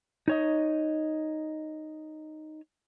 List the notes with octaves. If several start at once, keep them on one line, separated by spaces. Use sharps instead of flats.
D#4 C#5 D#5